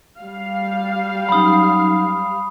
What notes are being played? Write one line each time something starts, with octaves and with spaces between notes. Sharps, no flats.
G3 F5
F#3 C#4 D#4 B5 D#6